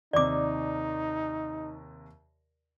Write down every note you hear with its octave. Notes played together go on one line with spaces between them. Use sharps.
D#2 C3 D#4 D5 D6